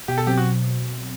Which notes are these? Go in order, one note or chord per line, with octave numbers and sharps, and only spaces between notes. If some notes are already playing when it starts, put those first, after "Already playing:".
B2 G4
A4
F#3 C4 G4
F#4